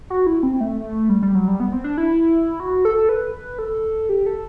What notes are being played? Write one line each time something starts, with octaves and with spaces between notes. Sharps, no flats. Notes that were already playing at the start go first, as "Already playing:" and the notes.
F#4
E4
C4
A3
G3
G3
F#3
G3
B3
C4
D4
E4
F#4
A4
B4
A4
G4
A4